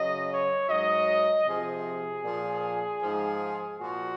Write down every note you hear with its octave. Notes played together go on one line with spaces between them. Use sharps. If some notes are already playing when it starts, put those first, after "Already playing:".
Already playing: F#2 C#3 F#3 D#5
C#5
G#2 F#3 D#5
C3 F3 G#4
A#2 F3
G#2 F3
A#2 F3 F#4